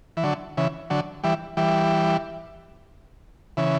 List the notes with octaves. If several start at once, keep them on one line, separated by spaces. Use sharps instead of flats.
E3
D3 F#3
C#3 E3
D3 F#3
E3 G3
E3 G3
C#3 E3